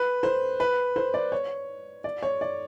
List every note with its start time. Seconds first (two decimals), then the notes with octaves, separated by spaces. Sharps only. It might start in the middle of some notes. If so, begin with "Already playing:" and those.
Already playing: B4
0.23 C5
0.60 B4
0.96 C5
1.14 D5
1.32 C#5
2.04 D5
2.23 C#5
2.41 D5